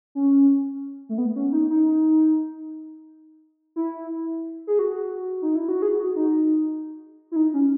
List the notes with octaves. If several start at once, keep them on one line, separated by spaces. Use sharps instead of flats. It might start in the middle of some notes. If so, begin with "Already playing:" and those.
C#4
A3
B3
C#4
D#4
D#4
E4
G#4
F#4
D#4
E4
F#4
G#4
F#4
D#4
E4
D#4
C#4